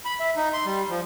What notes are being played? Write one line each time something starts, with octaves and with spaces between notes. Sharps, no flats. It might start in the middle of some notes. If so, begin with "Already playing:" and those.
B5
E5
D#4
C6
G3
F3